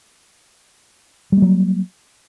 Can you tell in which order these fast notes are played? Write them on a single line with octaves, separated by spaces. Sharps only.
G3 A#3 F#3